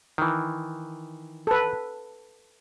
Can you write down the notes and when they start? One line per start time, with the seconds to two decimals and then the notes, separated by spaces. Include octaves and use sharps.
0.18 D#3 E3
1.47 A4 B4